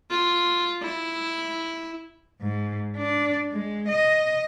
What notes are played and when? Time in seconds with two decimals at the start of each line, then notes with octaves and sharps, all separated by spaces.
0.11 F4
0.82 E4
2.41 G#2
2.97 D4
3.53 G#3
3.88 D#5